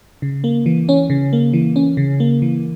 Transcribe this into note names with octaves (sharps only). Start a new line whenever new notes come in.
C#3
A#3
E3
C#4
C#3
A#3
E3
C#4
C#3
A#3
E3